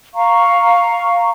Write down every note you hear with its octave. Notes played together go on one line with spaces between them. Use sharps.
F5 A#5 C#6